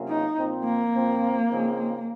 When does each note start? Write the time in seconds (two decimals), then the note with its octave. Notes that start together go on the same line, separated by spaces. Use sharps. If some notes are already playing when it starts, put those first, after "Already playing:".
Already playing: C3 F#3 A#3 C#4 F4
0.09 D#4
0.37 A#2 F3 C4
0.65 A#3
0.93 A#2 F3 C4
1.51 C#3 F3 C4 D#4 G#4